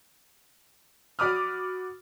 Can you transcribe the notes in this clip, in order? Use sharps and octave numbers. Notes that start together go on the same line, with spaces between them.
F#4 D5 B5 D6 D#6 F6